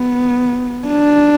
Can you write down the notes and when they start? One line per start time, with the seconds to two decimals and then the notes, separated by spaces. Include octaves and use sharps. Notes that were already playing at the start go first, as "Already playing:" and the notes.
Already playing: B3
0.87 D4